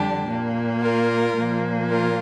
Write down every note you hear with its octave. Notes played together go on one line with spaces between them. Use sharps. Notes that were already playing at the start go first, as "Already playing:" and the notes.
Already playing: F2 D3 G3 D4 G4
A#2 A#3
F4 A#4
A#2 F3 A#3
F4 A#4